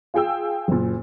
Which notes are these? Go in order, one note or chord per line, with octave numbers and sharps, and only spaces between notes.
F4 G#4 G5 E6
F#1 A#2